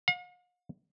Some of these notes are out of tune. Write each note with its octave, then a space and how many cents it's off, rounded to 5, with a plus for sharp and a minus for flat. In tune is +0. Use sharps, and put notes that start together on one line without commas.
F5 +45